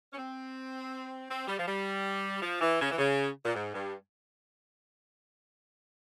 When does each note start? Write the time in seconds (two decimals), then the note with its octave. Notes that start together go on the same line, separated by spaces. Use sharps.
0.13 C#4
0.17 C4
1.29 C4
1.48 G3
1.58 F3
1.67 G3
2.42 F3
2.61 E3
2.80 C#3
2.91 E3
2.98 C#3
3.45 A#2
3.55 G#2
3.74 G2